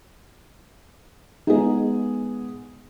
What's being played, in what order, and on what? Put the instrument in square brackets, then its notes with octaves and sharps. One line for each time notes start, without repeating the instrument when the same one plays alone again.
[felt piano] G#3 B3 G#4 [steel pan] D#4